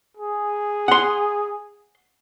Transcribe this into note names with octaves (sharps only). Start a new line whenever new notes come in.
G#4
F#5 C6